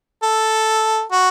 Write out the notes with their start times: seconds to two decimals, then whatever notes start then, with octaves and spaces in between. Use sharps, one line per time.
0.23 A4
1.12 F#4